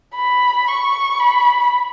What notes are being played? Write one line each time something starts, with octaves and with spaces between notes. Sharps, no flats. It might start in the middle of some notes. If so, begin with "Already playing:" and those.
B5
C#6
B5